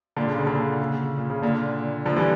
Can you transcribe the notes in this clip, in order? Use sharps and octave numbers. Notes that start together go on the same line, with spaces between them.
A#2 D3
C#3
C#3
D3
C#3
C#3
A#2
C#3
A#2 D3
D3 F3
E3 G3